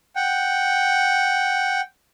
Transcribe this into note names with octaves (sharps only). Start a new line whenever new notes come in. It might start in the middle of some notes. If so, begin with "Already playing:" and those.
F#5 G5